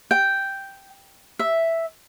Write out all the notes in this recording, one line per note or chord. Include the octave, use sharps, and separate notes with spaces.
G5
E5